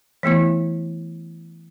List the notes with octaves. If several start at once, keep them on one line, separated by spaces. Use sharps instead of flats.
E3 A3 B3 E4